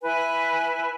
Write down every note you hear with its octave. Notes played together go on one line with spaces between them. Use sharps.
E4 B4 G#5